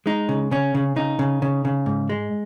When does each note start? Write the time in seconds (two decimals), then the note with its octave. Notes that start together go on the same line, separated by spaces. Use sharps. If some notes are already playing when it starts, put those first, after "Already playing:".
0.06 G#3 D#4
0.29 C#3
0.51 C#3 C#4
0.75 C#3
0.96 C#3 D#4
1.19 C#3
1.42 C#3
1.65 C#3
1.86 G#2
2.09 G#3